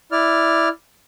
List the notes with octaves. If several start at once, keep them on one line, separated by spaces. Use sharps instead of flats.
E4 D5 F6